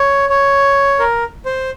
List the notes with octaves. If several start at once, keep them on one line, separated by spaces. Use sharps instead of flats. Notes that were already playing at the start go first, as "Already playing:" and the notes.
Already playing: C#5
C#5
A#4
C5